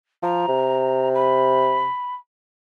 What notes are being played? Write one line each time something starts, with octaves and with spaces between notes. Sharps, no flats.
F3 A#5
C3
B5